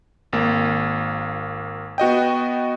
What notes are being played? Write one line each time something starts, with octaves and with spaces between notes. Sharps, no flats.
G#1 A#3
B3 F#4 D#5 G5